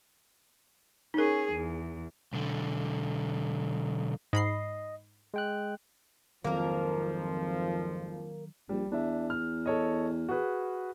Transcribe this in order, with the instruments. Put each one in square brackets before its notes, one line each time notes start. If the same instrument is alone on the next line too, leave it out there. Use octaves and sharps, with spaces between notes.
[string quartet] C#4 G#4 [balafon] D#4 A#4
[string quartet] E2
[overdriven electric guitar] B1 D3
[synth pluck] G#2 B5 C7 [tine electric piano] D#5
[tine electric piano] G#3 G5 F#6
[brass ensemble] G#1 F2 F3 [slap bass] D#3 F#3 [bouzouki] A#3 A#4
[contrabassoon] A#1 [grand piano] G3
[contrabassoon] E2 [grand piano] D4 E5
[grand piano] F6
A4 C#5 D#5
F#4 G#4 B4